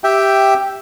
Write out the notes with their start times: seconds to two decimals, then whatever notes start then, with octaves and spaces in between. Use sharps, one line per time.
0.04 G4 E5 G5